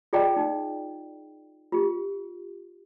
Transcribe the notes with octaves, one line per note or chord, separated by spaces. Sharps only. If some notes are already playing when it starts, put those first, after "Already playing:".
F4 G#4 D5 D#5 G5 A#5
D#4
F4 G4